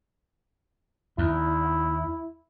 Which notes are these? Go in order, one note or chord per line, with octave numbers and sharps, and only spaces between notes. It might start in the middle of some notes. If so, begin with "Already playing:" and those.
D#2 E4